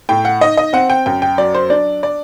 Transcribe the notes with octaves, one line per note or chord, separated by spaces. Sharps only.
A2 G5
F#5
D#4 D#5
D#5
C4 F#5
G5
F#2 G5
G5
F#3 D5
C5
D4 D5
D5